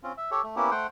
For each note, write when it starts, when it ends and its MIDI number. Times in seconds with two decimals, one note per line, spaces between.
0.03 0.12 60
0.03 0.12 61
0.03 0.12 65
0.17 0.31 76
0.31 0.42 67
0.31 0.42 69
0.31 0.42 73
0.44 0.56 57
0.56 0.71 58
0.56 0.71 59
0.56 0.71 61
0.56 0.71 64
0.56 0.71 67
0.71 0.87 57
0.71 0.87 72
0.71 0.87 78
0.71 0.87 79